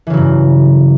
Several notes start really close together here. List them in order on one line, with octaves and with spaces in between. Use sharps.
E3 C#3 F#3 G2